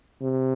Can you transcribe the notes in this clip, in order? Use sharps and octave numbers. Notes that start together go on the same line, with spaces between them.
C3